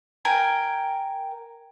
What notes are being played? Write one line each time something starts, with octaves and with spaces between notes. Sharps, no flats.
A#4 G5 G#5